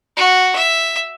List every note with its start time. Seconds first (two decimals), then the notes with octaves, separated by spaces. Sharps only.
0.17 F#4
0.56 E5